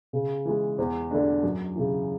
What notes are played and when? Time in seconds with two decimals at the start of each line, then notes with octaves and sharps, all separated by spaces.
0.13 C#3
0.45 E3 G#3
0.78 E2
1.11 D3 A3 D4
1.43 F#2
1.76 C#3 E3